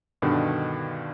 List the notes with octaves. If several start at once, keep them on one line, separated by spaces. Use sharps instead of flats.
G2 B2 D3 D#3